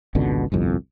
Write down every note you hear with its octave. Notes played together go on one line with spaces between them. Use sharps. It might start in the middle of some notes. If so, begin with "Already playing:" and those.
G#1 C#2 B2 D3
G1 C2 F2